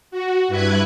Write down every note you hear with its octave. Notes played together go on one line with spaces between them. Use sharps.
F#4
G2 E4 B4 F#6 G#6